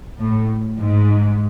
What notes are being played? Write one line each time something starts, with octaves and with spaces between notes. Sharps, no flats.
A2
G#2